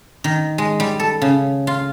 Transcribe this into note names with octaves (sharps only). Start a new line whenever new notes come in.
D#3
G#3
G3
A4
C#3
F4